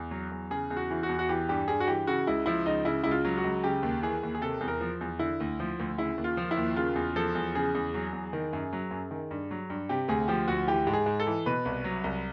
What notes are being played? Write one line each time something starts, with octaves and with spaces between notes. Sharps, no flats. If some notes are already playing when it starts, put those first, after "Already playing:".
Already playing: E2
F#3
E2
C#3 G#4
E2
F#4
E3
F#4
E2
F#4
E3 G4
G2 G4
G2 G#4
F#4
E3 G4
C#3 F#4
C#2 E4
F3 E4
C#2 D#4
C#3 E4
C#2 E4
F4
F#3
F#4
C#2
C#3 G4
D#2
E3 G#4
D#2
G#4
C3 A4
E2
A#4
F3
E2
D3 E4
D2
F3
D2
C#3 E4
D#2
F4
F3
E4
D#2
C#3 F4
E2
F3 A4
E2
C#3 G#4
E2
F#3
E2
D#3
F#2
F#3
F#2
D#3
G2
F#3
G2
C3 G4
D2 G#4
F3 G4
D2 F#4
E3 G4
G#2
G#4
G#2
A4
E3
B2 B4
C2
F#3
C2